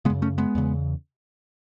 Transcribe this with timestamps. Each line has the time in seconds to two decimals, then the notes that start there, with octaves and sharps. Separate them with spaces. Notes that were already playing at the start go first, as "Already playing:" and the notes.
0.05 C#3 G#3 B3
0.10 F#2
0.22 A3 C#4
0.38 G#3 B3
0.55 E2 C#3